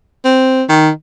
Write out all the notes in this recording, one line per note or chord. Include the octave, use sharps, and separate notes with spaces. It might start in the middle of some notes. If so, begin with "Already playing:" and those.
C4
D#3